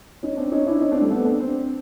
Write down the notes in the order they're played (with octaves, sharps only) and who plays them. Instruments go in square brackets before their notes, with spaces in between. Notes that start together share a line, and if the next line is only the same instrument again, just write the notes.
[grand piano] C#4 D#4
C4 D4
C#4 D#4
D4 E4
C#4 D#4
C4 D4
G3 A3
A3 B3
C4 D4
C4 D4